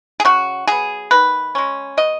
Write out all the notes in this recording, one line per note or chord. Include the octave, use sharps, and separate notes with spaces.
G#4
C#3 F#4
F#3 B3 G#4
D#3 B4
G#3 C#4
B2 D#5